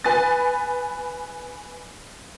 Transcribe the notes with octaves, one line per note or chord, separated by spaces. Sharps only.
B4 G#5 B5 D#6 A6